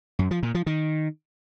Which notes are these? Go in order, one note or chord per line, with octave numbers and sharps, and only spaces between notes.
F#2
F3
A#2
F3
D#3